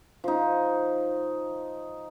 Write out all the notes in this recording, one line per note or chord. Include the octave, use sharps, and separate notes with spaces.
F3 D#4